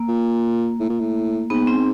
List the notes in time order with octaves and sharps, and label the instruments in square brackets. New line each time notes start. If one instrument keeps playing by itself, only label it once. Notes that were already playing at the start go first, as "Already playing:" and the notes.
Already playing: [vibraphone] A#3
[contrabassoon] A#2
A2
A#2
A2
[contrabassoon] G#2 [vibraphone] B3
[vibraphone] C4